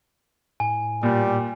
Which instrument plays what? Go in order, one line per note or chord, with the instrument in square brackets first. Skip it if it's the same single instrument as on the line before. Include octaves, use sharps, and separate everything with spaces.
[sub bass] A2 [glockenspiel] G#5
[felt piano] A#2 [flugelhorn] G3